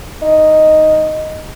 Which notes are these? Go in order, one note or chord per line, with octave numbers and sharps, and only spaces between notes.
D#4